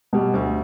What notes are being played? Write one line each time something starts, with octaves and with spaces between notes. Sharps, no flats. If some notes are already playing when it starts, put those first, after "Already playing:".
B2 G3
D2